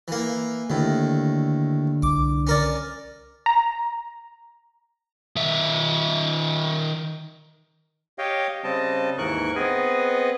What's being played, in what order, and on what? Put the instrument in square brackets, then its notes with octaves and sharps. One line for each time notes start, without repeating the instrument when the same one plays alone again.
[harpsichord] E3 A#3
[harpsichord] D#2 A2 [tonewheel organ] D3
[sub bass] C2 [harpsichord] D6
[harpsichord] C#4 A#4 D5
[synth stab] A#5
[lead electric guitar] D#3 E5
[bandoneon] G4 C#5 D#5 F5 G5
C#3 G3 C4 D#5 A5
D#2 G#2 E3 A#4 C#6 F#6
B3 C4 G#4 B4 D#5 G#5